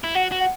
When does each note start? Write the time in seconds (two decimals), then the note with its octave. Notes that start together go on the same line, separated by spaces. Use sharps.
0.04 E4
0.15 F#4 F#5
0.32 F#4
0.40 F#5